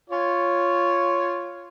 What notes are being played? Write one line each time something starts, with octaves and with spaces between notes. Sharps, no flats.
F4 C#5